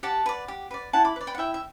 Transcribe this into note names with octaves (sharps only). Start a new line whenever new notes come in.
G4 F#5 A5
B4 D5
G4
B4 D5
E4 F#5 A5
B5 D6
B4 D5
G5 B5
F#5
E4 E5 G5
E5